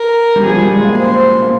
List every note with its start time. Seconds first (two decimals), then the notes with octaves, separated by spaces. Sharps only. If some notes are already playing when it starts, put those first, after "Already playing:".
Already playing: A#4
0.36 G3
0.45 F3 G#4
0.59 G3
0.72 G#3
0.85 A#3
0.98 C5
1.42 A#3